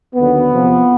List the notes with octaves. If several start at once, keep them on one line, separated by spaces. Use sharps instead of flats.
D#2 D3 F#3 B3
E2 C3 F3